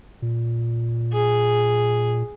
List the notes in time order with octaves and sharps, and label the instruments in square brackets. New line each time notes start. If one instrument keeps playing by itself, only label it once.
[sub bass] A#2
[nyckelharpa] G#4